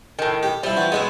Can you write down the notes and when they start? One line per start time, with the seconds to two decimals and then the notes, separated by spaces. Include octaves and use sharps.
0.19 A2 D#3
0.43 G4
0.63 F3 G3 E4
0.77 E3 F#4
0.92 G#3 B3 D#4 E4 F#4